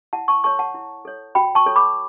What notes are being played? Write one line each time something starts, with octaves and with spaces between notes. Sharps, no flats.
E4 F#5 A5
A5 C#6
A4 C#5 A5 C#6
F#5 A5
E4
A4 C#5
F#4 G5 B5
A5 C#6
A4 C#5
B5 D6